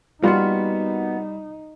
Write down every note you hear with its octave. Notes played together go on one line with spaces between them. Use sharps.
G3 A#3 B3 D#4 F4 F#4